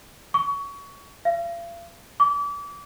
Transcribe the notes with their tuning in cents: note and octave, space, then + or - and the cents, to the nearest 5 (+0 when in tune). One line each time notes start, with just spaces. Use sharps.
C#6 +25
F5 -40
D6 -35